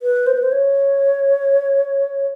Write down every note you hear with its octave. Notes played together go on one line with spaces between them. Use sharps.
B4
C5
B4
C5
C#5